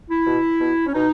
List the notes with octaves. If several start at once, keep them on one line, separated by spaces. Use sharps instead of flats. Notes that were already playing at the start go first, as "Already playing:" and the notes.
E4
B2
B2
C#4
B2 D#4